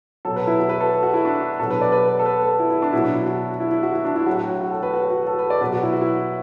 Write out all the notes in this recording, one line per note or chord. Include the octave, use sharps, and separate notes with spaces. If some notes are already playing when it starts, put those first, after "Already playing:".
B2 F#3 A4
B4
E4
F#4
B4
A4
F#4
E4
D4
B2 F#3 A4
B4
D5
B4
B4
A4
B4
A4
E4
E4
D4
B2 F#3 E4
D4
E4
F#4
E4
E4
F#4
E4
D4
E4
A2 F#3 F#4
F#4
A4
B4
F#4
F#4
A4
B4
D5
B2 F#3 B4
F#4
E4
F#4
E4